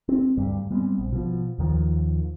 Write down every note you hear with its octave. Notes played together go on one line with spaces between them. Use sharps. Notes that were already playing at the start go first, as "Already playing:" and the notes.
C4
D2 G2 G3
G3 G#3 B3 C4
A#1
B2 F3
D#2 D#3 F3